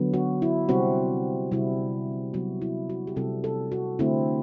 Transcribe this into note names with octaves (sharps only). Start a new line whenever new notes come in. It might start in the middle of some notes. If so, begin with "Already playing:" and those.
Already playing: D3 F#3 B3
F#4
E4
C3 G3 C4 F#4
C3 G3 C4 E4
C3 F#3 B3 F#4
E4
F#4
G4
C3 G3 C4 E4 A4
A4
F#4
D3 A3 C4 E4